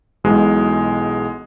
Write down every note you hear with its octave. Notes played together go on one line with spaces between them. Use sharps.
B1 B2 E3 G#3